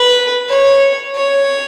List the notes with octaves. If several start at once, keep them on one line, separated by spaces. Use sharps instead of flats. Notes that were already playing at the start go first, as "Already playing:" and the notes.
Already playing: B4
C#5
C#5